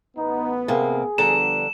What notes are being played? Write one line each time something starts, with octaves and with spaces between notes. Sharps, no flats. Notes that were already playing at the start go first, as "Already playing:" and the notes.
A1 B3 D#4
C3 A#3 G#4
D3 F3 G3 B3 D4 A#5 E7